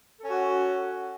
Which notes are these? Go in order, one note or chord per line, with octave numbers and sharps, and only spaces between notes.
C#4 F#4 A4